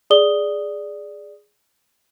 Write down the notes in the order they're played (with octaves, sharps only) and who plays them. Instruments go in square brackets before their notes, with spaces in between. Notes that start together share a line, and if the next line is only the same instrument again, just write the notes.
[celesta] G#4 D5 D#6 G7